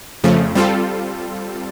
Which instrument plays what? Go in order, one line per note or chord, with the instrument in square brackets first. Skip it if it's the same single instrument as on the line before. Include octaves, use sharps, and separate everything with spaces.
[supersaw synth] F2 C#3 F3 A3
G3 C4 F4 A4